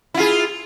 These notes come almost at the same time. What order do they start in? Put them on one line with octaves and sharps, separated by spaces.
E4 F4 G#4